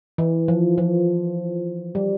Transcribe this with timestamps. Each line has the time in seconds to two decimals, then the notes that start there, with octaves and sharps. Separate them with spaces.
0.18 E3
0.48 F3
0.78 F3
1.95 G3